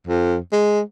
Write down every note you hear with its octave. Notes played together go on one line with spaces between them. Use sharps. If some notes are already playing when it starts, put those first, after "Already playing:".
F2
G#3